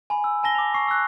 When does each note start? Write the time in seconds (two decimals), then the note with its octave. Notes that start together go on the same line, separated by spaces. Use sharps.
0.10 G#5 B5
0.24 E6
0.43 G#5 A5 A#6 G7
0.55 D6 F7
0.74 C#6 C7
0.88 E6 F#6